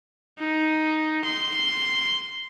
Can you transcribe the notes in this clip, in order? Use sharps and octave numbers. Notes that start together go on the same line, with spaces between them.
D#4
C6